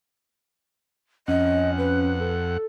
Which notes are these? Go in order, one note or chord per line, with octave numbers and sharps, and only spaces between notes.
F2 C#4 D#5 F#5
B4
A4